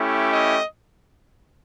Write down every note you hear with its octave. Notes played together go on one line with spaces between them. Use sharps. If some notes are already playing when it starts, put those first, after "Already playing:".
Already playing: A3 C#4 E4 G4
D#5